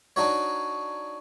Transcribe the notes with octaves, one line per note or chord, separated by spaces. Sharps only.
D4 D#4 F#4 C#5